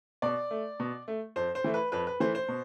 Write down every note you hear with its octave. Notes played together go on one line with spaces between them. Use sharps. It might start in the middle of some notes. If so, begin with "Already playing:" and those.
B2 D5
A3
B2
A3
F2 C5
C5
E3 A3
B4
F2 B4
B4
E3 A3 C5
C5
B2